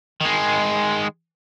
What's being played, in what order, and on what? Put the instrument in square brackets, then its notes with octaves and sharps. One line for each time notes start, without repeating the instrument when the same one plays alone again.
[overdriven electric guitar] D#3 G#3